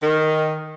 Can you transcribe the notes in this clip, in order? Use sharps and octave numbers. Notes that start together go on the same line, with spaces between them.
D#3